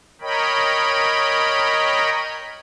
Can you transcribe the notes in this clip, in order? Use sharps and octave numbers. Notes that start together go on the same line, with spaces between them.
A#4 C#5 D#5 G5 B5